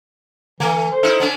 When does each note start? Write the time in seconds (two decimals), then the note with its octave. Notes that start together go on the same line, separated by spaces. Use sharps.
0.60 D3 E3 A3
0.91 C5
1.03 D#4 E4 A4 F6
1.20 D3 C#4